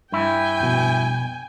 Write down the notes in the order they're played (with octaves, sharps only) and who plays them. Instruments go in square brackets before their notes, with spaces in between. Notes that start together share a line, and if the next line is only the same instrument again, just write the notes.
[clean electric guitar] G2 E4 [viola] G5 G#5
[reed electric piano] F2 B2